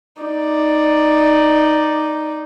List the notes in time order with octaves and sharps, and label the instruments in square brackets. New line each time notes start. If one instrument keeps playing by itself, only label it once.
[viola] D#4 D5